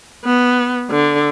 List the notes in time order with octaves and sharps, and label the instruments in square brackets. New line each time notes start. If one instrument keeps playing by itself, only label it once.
[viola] B3
D3